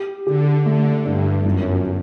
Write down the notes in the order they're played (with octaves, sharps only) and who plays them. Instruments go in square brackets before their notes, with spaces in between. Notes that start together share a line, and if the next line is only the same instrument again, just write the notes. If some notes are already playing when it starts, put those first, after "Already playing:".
Already playing: [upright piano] G4
[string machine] D3 [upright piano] G4
[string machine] D3 [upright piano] A3
[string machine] G2 [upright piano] D4
[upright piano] G1 [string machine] F#2